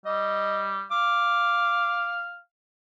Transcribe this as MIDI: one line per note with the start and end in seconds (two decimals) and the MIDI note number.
0.06 0.84 55
0.06 0.74 75
0.91 2.39 77
0.91 2.22 86